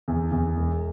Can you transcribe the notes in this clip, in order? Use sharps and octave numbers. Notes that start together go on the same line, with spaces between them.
E2
E2
E1